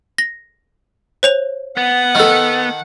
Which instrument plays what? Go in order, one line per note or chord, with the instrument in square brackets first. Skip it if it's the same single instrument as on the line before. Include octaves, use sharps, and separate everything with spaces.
[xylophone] A#6
C5 C#5 F7
[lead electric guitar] B3 [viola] F#5
[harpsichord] D#3 A4